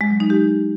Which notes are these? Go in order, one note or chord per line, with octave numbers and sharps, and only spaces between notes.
G#3
F#3
D#4
G4